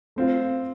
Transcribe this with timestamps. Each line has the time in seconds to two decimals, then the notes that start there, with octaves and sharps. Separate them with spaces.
0.16 A3 C4 F4